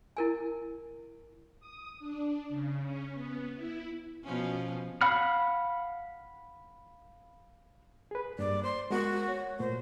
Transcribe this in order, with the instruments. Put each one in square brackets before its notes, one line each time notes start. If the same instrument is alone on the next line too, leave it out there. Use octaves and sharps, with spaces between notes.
[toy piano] E4 A#4 G#5
[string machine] D#6
D4
C#3
C#4
B3
E4
[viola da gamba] B2 F3 C#4
[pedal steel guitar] F5 F#5 B5 F6
[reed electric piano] G#4 B4
[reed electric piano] G2 A#3 [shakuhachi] D5
[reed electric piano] C5 [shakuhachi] C6
[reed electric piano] G#3 B3 A#4 [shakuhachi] F#4
[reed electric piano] C#5
[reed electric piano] A#2 A3 [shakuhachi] C5